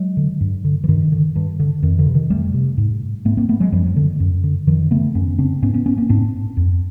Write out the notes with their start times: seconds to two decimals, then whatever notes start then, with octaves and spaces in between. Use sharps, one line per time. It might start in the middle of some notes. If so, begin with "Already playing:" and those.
Already playing: F#3 G#3
0.17 D3
0.41 G2
0.65 D3
0.84 E3
0.88 G2 D#3
1.12 D3
1.36 G2
1.60 D3
1.82 F2 D#3
1.98 D3 E3
2.06 C3
2.14 D#3
2.30 F2 G3 A3
2.54 C3
2.77 G#2
3.25 G#2 A3 B3
3.37 A#3 C4
3.49 A3 B3
3.60 F#3 G#3
3.72 F#2 F3 G3
3.96 D3
4.20 F#2
4.44 D3
4.67 F#2 D#3 F3
4.91 C#3 A3 B3
5.15 F#2 B3 C#4
5.38 C#3 C4 D4
5.62 G#2 B3 C#4
5.74 B3 C#4
5.86 B3 C#4
5.98 A#3 C4
6.09 G#2 C4 D4
6.57 F2